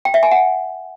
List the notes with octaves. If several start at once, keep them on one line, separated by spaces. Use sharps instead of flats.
G5
E5
G#5
F#5